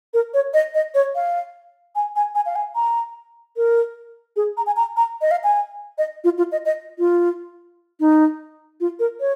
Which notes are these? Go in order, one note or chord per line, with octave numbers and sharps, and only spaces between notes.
A#4
C#5
D#5
D#5
C#5
F5
G#5
G#5
G#5
F5
G#5
A#5
A#4
G#4
A#5
G#5
A#5
A#5
D#5
F5
G#5
D#5
F4
F4
D#5
D#5
F4
D#4
F4
A#4
C#5